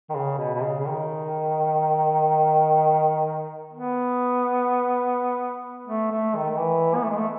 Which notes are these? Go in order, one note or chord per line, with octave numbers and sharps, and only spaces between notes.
D#3
C#3
B2
B2
C#3
C#3
D#3
B3
A3
A3
D#3
D#3
E3
B3
A3
G#3
A3